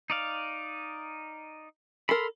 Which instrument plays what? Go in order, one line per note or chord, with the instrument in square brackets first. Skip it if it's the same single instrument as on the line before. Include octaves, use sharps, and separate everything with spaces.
[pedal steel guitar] D#4 D5 F5
[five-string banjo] A4 A#4 [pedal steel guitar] B5 C6